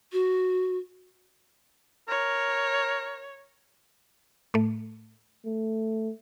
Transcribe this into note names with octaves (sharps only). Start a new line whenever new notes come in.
F#4
A#4 C#5
A2 A3
A3